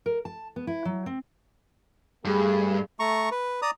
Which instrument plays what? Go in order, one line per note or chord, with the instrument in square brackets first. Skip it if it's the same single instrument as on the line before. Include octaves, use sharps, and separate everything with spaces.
[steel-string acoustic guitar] A#4
A5
B3
E4
F#3
C4
[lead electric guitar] G2 [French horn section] A3 G#4
[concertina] A3 A#5 C#6
B4
D5 A#5 D#6